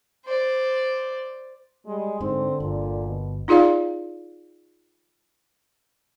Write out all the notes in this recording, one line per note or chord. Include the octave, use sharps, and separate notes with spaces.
C5 D5
G3 G#3
G#2 D3 C4
G1 A#2
B2
D#4 F4 G#4 D5 F5